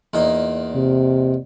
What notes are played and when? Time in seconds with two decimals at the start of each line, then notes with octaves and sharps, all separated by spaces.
0.14 E2 A#2 D#4
0.75 C3